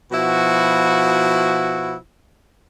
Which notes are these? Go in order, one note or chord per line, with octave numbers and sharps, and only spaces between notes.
B2 F3 E4 F#4